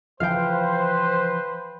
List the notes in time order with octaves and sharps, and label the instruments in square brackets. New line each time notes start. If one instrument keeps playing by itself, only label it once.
[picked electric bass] C#3 E3 F3 [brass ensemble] B4 C5 [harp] F5 G5